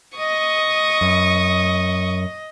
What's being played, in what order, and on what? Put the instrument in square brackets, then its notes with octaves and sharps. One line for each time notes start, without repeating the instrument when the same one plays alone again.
[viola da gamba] D#5 [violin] C#6 D#6
[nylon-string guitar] F#2